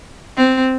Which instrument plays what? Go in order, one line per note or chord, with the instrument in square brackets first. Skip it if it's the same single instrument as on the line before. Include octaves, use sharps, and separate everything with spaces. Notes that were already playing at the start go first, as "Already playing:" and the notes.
[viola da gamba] C4